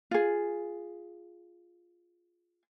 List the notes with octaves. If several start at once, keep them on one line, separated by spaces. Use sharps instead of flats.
F4 G#4